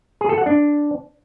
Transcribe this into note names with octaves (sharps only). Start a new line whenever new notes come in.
G#4
A4
F#5
D4